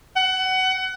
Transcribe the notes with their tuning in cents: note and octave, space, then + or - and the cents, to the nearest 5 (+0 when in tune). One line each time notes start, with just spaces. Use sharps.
F#5 +25